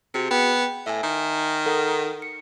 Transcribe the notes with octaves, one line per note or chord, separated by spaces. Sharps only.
C3 F#4 G#4 C#7
B3 G5
A2 E5 G#5
D#3
A4 A#4 F#5
C#7